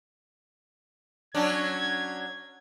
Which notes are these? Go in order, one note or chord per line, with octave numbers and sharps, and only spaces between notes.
F#3 C#4 D4 G#6